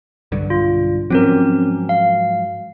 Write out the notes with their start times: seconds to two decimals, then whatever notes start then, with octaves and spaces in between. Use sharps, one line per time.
0.32 B1 G2 D3
0.50 F4
1.10 G#2 F3 F#3 C4 C#4 A#4
1.89 F5